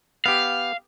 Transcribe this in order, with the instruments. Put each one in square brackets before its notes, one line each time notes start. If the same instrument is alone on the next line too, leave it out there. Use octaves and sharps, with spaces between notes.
[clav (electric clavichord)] B3 G4 [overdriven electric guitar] F5